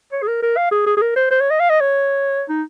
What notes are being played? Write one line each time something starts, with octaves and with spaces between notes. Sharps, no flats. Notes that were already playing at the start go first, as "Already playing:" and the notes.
C#5
G#4
A#4
A#4
F5
G#4
G#4
G#4
A#4
C5
C5
C#5
D#5
F5
D#5
C#5
D#4